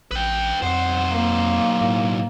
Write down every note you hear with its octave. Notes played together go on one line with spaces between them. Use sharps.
A1 B4 G5
B1 F2 C5 F#5
A#3
A2